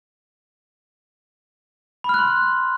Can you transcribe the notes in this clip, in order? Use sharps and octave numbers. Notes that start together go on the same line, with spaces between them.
B5 C6 F6 F#6